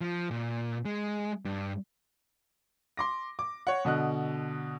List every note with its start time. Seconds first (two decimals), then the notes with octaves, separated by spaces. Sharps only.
0.01 F3
0.31 A#2
0.85 G#3
1.45 G2
2.97 C6 D6 A#6
3.39 D6
3.67 C#5 F#5
3.85 B2 D3 D#5 F#6